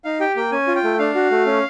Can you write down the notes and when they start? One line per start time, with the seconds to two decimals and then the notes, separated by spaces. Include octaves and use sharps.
0.04 D#4 F5
0.20 G4 G5
0.36 A#3 G5
0.52 C#4 G#5
0.67 F4
0.76 G5
0.84 A3
0.99 D4 F5
1.15 F#4
1.31 A3
1.46 C#4